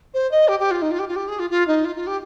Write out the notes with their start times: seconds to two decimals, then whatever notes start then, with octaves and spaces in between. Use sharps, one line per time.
0.13 C5
0.31 D#5
0.47 G4
0.59 G4
0.70 F4
0.81 D#4
0.91 F4
0.98 G4
1.07 F4
1.15 G4
1.27 G#4
1.39 F4
1.50 F4
1.67 D#4
1.84 F4
1.95 F4
2.06 G4